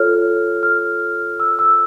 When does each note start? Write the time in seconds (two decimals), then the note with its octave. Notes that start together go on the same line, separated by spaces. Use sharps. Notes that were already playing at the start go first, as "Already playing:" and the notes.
Already playing: F4 A4 C#5 F6
0.63 F6
1.40 E6
1.59 E6